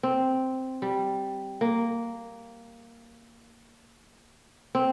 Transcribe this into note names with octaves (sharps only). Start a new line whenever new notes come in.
C4
G3
A#3
C4